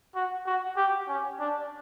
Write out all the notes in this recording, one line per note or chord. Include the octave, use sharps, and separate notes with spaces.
F#4
F#4
G4
C#4
D4